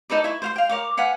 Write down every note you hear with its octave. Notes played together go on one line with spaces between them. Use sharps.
D#4 A4 B4 D5
E4 C#6
C5 F5 C6
F5 G5
A#4 C#5 D6
B4 F5 F#5 G#5